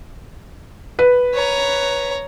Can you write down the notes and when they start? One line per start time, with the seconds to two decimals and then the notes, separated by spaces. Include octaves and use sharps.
0.99 B4
1.34 C#5 A#5